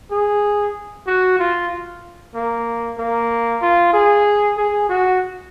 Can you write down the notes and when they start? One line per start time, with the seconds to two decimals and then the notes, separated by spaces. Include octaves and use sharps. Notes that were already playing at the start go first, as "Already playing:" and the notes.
0.12 G#4
1.07 F#4
1.39 F4
2.35 A#3
2.99 A#3
3.62 F4
3.94 G#4
4.58 G#4
4.90 F#4